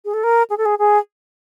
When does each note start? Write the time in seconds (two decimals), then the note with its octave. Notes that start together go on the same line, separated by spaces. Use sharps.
0.05 G#4
0.14 A4
0.23 A#4
0.50 G#4
0.58 A4
0.65 G#4
0.79 G#4